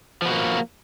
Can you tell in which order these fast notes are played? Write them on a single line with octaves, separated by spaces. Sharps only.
F3 B3 F#4 A#3